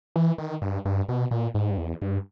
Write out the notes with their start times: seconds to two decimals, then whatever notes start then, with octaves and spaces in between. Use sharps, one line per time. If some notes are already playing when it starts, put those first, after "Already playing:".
0.16 E3
0.38 D#3
0.62 G2
0.85 G2
1.09 B2
1.31 A#2
1.55 G#2
1.71 G2
1.78 E2
2.02 G2